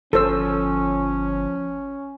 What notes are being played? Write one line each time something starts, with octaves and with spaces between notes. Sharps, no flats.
G1 F3 C#4 A4 C5 E6